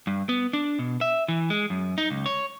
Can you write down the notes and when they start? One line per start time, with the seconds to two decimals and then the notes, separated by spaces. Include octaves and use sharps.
0.07 G2
0.29 B3
0.53 D4
0.79 B2
1.01 E5
1.28 E3
1.50 G#3
1.70 F#2
1.98 D#4
2.10 C#2
2.26 C#5